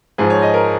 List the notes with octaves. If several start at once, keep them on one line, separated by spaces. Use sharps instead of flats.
G#2 F3 G#4
C#5
D#5
A#4